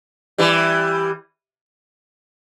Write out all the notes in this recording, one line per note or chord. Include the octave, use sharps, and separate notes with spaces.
E3 G3